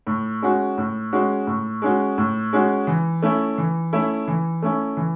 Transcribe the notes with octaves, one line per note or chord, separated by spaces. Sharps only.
A2
G#3 C#4 F#4
A2
G#3 C#4 F#4
A2
G#3 C#4 F#4
A2
G#3 C#4 F#4
E3
A3 C#4 E4
E3
A3 C#4 E4
E3
A3 C#4 E4
E3